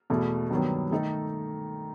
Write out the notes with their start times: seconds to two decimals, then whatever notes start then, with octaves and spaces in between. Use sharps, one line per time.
0.10 E2 B2 A3
0.50 G2 D#3 F#3 B3
0.91 D#3 A3 D#4 A4